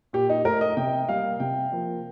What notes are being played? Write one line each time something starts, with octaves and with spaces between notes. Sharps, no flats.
A#2 G4
D#4
A3 A#4
D#5
C3 G5
G3 A#3 F5
C3 G5
F3 A#3